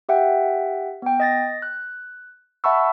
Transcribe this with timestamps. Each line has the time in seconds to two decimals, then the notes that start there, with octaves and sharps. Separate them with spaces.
0.09 G4 E5 F#5 G5
1.02 B3 G5
1.20 D#5 A6 A#6
1.62 F#6
2.64 E5 F#5 A5 B5 C#6 E6